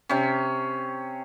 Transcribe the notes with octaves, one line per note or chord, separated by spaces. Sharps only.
C3 C#4